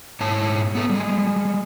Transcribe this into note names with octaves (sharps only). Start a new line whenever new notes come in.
G#2 E4 C#5 A5
B3 A4
G3 G#3